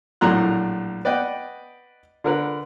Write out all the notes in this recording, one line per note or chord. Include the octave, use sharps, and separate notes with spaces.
A#1 A2 F#3 A#5 C6 F#6
B4 D5 D#5 F#5 G5
D3 A#4 B4